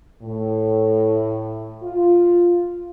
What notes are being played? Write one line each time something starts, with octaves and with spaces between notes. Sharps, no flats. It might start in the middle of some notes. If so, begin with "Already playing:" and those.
A2
F4